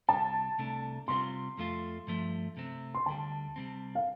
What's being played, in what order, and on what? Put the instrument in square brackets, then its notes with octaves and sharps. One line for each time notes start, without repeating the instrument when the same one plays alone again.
[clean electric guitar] C2 C3 G3 [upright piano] A5
[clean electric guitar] C2 C3 A3 D4
[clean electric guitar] C3 G3 C4 F4 [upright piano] C6
[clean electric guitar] F2 F3 A3 F4
G2 F3 A3
C3 A3 C4
[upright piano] C6
[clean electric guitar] D2 D3 G3 [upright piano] A5
[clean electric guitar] C3 G3 C4
[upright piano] F5